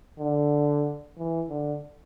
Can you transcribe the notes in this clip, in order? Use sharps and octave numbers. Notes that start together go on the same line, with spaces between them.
D3
E3
D3